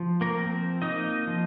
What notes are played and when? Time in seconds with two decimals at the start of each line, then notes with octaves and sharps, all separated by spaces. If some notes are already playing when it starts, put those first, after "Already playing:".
Already playing: F3
0.21 A#3 A#4
0.36 C4
0.82 A#3 D#4 D#5
1.27 F3